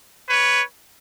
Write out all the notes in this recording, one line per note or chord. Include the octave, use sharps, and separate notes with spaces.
B4 C#5